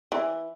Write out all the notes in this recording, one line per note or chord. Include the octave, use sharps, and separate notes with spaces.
E3